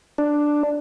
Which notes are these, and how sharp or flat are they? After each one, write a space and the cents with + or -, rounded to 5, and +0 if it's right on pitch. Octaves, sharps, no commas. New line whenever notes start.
D4 +5